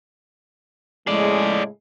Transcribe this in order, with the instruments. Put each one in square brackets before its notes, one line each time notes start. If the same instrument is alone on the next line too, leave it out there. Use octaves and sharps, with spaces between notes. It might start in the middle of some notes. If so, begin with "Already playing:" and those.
[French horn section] A2 C#3 G#3 [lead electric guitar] G#4 D5